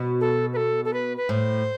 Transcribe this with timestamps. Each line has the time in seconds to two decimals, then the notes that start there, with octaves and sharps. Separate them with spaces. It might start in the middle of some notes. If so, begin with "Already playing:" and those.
Already playing: B2
0.21 A4
0.53 B4
0.57 A4
0.85 A4
0.93 B4
1.17 B4
1.29 A2 C5